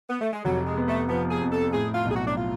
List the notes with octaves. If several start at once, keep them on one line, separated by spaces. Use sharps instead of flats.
B3
A3
G#3
F1 F#3
G#3
B3
A3
F3 B3
G#4
F2
A4
A2 G#4
F4
B1
G#4
F#4
D4
F4